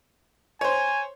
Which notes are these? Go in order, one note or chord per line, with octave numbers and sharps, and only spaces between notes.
C5 C#5 G#5